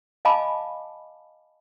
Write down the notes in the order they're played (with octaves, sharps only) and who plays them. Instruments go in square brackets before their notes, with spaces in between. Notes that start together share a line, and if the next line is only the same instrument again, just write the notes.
[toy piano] D#5 F5 G#5 A5 B5 D6